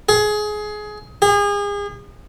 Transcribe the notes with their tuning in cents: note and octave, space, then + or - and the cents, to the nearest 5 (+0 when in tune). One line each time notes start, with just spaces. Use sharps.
G#4 +20
G#4 -35